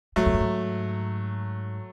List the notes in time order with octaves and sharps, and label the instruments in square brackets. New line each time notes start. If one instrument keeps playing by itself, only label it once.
[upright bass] A2 [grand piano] F#3 A3
[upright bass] E2
F#2
G#2